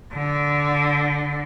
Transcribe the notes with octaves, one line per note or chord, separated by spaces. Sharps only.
D3